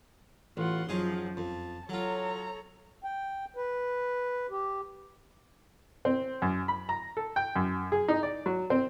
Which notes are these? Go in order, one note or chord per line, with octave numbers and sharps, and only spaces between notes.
A1 F4 F#5 C6
F#2 F3 F#3 D#4 G#4
F2 A5
F#3 F4 A4 C#5 A#5
G5
B4
G4
C4
F#2
B5
A#5
A4
G5
F#2
G#4
D#4
D5
F#3
C4